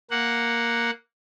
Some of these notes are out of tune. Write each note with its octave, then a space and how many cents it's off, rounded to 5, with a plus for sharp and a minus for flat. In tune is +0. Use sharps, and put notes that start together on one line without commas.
A#3 +0 F#5 +0